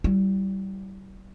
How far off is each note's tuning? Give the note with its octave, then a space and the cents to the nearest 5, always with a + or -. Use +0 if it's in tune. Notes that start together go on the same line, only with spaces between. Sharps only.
G3 -30 E4 +0